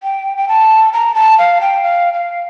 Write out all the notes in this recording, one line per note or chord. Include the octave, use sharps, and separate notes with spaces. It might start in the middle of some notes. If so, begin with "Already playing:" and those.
G5
G5
A5
A#5
A5
F5
G5
F5
F5